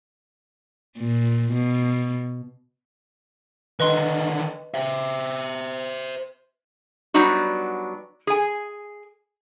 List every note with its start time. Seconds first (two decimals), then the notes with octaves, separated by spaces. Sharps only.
0.98 A#2
1.54 B2
3.80 D3 D#3 B4 D#5 C6
4.74 C5 E5
7.14 F#3 G3 B3 D4 D#4 F#4
8.27 G#4 G#5